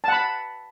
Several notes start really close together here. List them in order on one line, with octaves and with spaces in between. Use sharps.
A5 F#5 B5